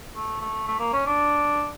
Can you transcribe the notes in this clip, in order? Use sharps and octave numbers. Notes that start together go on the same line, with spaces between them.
A3
A3
A3
A#3
C#4
D4